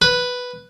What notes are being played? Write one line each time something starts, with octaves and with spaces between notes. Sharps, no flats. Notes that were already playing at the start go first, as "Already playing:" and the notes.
B4